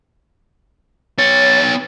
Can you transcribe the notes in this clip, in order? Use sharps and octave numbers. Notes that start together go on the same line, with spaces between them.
B3 C#5 A6